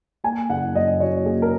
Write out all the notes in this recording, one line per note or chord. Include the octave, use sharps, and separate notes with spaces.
A#3 G#5
F#1 F#5
F#2 D#5
F#3 C#5
A#3 G#4
A#4